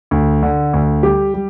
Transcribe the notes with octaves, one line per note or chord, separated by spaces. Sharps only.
D2
D3
D2
G3 G4
G3